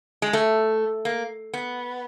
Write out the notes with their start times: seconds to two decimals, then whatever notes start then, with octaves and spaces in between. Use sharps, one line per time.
0.22 G#3
0.33 A3
1.05 A#3
1.53 B3